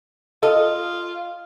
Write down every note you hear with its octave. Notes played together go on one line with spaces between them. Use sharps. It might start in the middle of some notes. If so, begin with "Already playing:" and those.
F4 A4 D#5